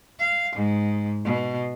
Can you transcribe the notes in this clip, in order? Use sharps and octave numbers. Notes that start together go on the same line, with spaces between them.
F5
G#2
B2